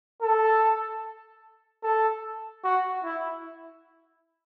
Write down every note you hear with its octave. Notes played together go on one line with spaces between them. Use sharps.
A4
A4
F#4
E4